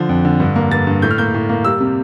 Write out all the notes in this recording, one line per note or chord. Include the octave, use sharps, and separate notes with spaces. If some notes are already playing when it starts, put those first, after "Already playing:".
Already playing: D3 F3
F2
D3
G2
A#3
G2 A6
G2
A2 G6
F6
A#3 G6
A2
A#3
G3 E6
C3